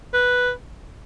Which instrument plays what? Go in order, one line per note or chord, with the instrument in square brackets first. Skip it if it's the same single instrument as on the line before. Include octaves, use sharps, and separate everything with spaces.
[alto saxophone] B4